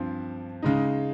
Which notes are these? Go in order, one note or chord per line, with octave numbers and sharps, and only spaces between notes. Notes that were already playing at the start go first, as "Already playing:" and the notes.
Already playing: G2 F3 C4
C#3 G#3 D#4